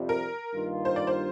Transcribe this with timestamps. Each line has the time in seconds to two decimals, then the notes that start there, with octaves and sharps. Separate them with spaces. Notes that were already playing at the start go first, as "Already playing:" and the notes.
Already playing: F2 C3 G3
0.09 A#4
0.54 G2 D#3 A#3 F4
0.85 C5
0.96 D5
1.07 C5